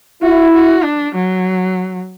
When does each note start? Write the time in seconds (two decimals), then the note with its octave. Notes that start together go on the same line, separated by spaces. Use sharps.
0.23 E4 F#4
0.54 F#4
0.84 D4
1.15 F#3